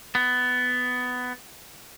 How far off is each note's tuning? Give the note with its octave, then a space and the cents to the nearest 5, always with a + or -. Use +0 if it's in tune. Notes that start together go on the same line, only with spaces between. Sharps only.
B3 +15